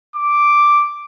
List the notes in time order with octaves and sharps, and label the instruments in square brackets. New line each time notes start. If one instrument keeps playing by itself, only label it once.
[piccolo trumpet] D6